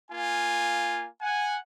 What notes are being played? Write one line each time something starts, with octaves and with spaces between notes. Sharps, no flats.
A#3 F4 G#5
F#5 G#5